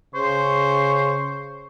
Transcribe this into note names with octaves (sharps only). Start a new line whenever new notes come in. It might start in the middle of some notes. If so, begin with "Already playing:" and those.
C#3 C5 C#6